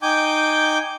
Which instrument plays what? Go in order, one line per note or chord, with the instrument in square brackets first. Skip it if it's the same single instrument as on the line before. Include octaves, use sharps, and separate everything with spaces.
[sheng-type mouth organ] D#4 G5 G#5 D6 G6